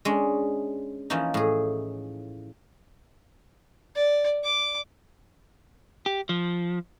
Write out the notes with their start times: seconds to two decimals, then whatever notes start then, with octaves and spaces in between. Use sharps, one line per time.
0.05 G#3 C#4 D4
1.10 E3 F3 A#3 C#4 D#4
1.34 A2 G#4
3.95 D5
4.44 D6
6.06 G4
6.29 F3